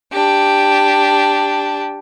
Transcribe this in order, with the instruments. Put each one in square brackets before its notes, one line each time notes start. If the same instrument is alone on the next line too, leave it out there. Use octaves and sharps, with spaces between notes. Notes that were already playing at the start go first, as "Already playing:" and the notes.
[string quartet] D4 G4